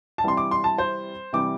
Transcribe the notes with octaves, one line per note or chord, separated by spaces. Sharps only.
A5
C3 E3 G3 C6
D6
C6
A5
C5
C3 E3 G3 D6